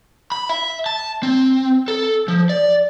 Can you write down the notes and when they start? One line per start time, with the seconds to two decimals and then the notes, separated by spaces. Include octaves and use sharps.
0.32 B5
0.49 E5
0.86 A5
1.23 C4
1.88 A4
2.28 F3
2.49 D5